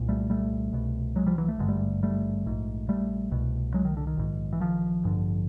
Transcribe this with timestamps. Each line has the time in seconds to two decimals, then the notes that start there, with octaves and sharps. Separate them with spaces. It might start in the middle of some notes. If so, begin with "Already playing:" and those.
Already playing: C2 A#2
0.09 G3 A3
0.30 G3 A3
0.73 C2 B2
1.16 F#3 G#3
1.26 F3 G3
1.38 E3 F#3
1.48 A3
1.59 G#1 G2 D3 G#3
1.68 G3 A3
2.03 G3 A3
2.46 A#1 G#2
2.89 G3 A3
3.31 C2 B2
3.74 F#3 G#3
3.85 D#3
3.97 D3
4.07 D#3
4.17 A#1 G#2
4.53 E3
4.60 D#3 F3
5.04 A1 G2 D3